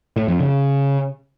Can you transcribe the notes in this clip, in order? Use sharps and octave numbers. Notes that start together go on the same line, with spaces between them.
A2
F2
C#3